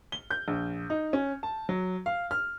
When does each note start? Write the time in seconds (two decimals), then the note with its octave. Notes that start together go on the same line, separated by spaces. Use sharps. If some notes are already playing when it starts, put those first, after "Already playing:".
0.12 G7
0.31 G6
0.48 A#1
0.90 D#4
1.13 C#4
1.43 A5
1.69 F#3
2.06 F5
2.31 F6